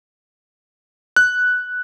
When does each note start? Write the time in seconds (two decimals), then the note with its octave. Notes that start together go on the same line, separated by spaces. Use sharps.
1.16 F#6